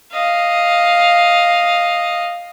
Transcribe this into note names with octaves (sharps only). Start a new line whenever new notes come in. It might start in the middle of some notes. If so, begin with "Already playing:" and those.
D#5 F5